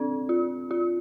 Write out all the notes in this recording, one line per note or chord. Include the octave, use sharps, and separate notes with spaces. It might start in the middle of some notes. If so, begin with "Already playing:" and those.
Already playing: C4 D4
F4
F4